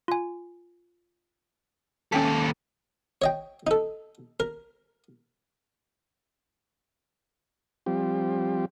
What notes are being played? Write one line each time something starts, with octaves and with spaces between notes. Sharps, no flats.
F4 G#5
D#2 C#4 A4 G5 B6
C#5 D#5 G5
D#4 A4
A#4
F3 G3 C4 G4